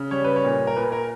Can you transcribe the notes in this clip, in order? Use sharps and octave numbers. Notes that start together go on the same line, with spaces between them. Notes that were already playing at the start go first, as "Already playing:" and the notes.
Already playing: C#3
G3 C#5
B4
C#5
A#2
A#4
A#2 B4
A#4